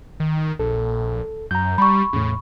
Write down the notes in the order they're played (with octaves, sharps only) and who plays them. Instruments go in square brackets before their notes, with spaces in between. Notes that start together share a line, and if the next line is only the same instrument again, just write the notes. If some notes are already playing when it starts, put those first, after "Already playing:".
[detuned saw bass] D#3
[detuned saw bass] A#1 [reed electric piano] A4
[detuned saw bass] F#2 [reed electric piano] A#5 G6
[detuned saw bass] G3 [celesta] B5 C#6
[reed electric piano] E2 A2 [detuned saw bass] C#3